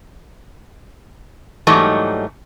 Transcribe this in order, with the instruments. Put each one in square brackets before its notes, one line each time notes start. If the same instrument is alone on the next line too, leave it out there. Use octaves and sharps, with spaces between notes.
[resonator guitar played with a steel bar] G#2 E3 F#3 G3 A3 D#4